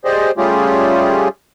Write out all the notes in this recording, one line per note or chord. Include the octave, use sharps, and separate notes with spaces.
G4 G#4 C5 D5 D#5
G3 A3 C#4 F4 G4 G#4